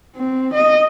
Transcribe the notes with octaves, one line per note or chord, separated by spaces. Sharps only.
C4
D#5